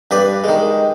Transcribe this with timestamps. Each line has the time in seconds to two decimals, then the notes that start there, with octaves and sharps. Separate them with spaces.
0.11 G2 B4 D5
0.44 D#3 G#3